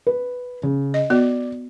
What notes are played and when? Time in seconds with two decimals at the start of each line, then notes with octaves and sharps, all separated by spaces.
0.07 B4
0.63 C#3
0.94 D#5
1.10 B3 F#4 D5